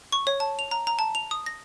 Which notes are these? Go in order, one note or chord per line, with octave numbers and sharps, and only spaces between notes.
C#6
C#5
A5
F7
A#5
A#5
A5
F7
D#6
A#6